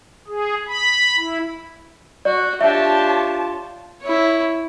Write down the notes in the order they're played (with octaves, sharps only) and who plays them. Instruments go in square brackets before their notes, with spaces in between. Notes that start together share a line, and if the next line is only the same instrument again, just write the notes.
[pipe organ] G#4
B5
E4
[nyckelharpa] F#4 [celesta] D5
[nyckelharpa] D4 G4 [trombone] F4 [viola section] C#5 A5 [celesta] E5
[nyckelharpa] E4 C#5